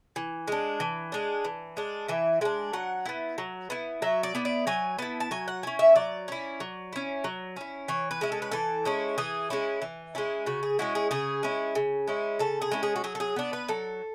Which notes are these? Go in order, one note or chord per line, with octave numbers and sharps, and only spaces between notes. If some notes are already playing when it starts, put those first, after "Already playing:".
E3
G#3 D4
E3
G#3 D4
E3
G#3 D4
E3 E5
G#3 D4 G#5
F#3 F#5
B3 E4
F#3
B3 E4
F#3 E5
D5
B3 E4
D5
F#3 G#5
B3 E4 A5
A5
F#3 G#5
F#5
C#4 E4 G#5
E5
F#3 D5
C#4 E4
F#3
C#4 E4
F#3
C#4 E4
E3 C#5
B4
G#3 C#4 E4
A4
B4
E3 A4
G#3 C#4 E4
E3 G#4
G#3 C#4 E4
E3
G#3 C#4 E4
C#3 F#4
G#4
G#3 C#4 E4 F#4
G#4
C#3 G#4
G#3 C#4 E4
C#3
G#3 C#4 E4
C#3 A4
G#4
G#3 C#4 E4
G#4
F#4
F#3 G#4
A4
G#4
B3 D4
B4
F#3 A4